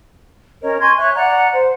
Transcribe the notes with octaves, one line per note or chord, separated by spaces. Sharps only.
C#4 A#4 C#5 D#5
G#5 C6 C#6 G#6
C#5 E5 C#6 F#6
D5 F#5 A#5 F#6
C5